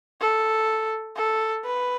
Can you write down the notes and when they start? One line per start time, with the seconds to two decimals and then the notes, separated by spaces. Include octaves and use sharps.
0.21 A4
1.17 A4
1.65 B4